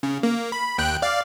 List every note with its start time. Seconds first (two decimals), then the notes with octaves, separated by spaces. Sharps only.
0.03 C#3
0.23 A#3
0.52 B5
0.78 D#2 G5 F#6
1.02 D5 F5